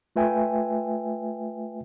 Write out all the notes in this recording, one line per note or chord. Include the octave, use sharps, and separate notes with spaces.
A3 F4 B4 E5 G5 G#5